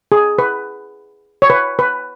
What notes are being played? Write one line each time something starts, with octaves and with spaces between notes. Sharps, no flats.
G#4
B4
C#5
B4
B4